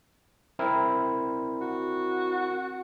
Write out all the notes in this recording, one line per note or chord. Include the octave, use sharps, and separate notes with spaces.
C4 E4 A#4
F#4